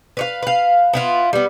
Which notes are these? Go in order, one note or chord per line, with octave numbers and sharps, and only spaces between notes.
B4 C#5 F5
B4 F5
B3 E4 F4
G3 B3